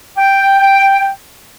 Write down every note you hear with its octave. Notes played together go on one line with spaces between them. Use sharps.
G5